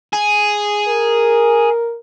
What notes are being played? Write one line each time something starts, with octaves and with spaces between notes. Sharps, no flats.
G#4
A#4